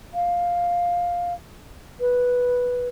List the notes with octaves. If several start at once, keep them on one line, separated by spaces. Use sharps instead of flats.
F5
B4